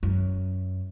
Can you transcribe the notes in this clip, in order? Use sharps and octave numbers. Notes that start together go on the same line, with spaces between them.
F#2